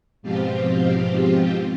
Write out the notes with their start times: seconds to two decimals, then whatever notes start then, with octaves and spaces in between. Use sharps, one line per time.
0.22 G#2 B2 F3 C4 F4 G4